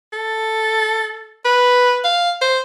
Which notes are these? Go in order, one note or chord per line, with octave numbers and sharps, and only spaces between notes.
A4
B4
F5
C5